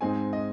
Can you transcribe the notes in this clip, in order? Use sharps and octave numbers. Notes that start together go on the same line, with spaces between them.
G#2 G#3 C4 D#4 G#5
D#5